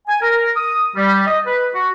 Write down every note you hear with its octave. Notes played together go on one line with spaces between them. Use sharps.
G#5
A#4
D#6
G3
D#5
B4
F#4